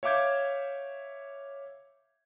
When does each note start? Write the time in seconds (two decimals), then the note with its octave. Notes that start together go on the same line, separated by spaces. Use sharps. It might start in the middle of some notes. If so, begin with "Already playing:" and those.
0.03 C#5 E5 F5 D6 G6 G#6